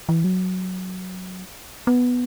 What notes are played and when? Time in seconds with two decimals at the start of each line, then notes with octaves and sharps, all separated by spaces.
0.09 E3
0.24 F#3
1.87 B3